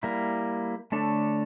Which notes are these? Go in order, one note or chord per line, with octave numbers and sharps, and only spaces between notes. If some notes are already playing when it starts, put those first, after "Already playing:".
G3 A#3 E4
D3 A3 D4 A4 C#5